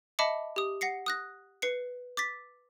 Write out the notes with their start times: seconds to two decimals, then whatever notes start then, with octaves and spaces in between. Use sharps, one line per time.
0.19 D#5 E5 A5 B5 D6 C#7
0.56 G4 D#6
0.81 F#5 A#6 C7 C#7
1.06 D#6 F#6 A#6
1.62 B4 C7 C#7
2.17 D6 A6 B6